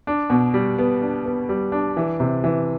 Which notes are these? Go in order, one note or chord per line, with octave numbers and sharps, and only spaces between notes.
D4
B2
G3
B3
D4
B3
G3
D4
E3
C3
E3